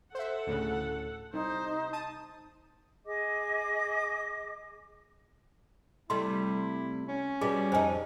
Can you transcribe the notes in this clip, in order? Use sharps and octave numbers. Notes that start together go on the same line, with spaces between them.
A4 C5 E5 F#5
D2 A2 C#3
C2 D#4 C5
A5 D#6
G#4 D#5 D6
C3 G3 A3 E4 C6
C#4
B2 G3 G#4
F2 D#4 C5 G#5